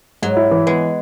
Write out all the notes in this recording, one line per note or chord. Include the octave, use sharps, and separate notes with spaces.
G#2 F#3
E4
E3
G#3 B3